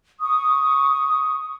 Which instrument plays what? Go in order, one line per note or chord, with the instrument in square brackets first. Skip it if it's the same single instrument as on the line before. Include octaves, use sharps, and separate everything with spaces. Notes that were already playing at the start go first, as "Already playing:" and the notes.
[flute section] C#6 D#6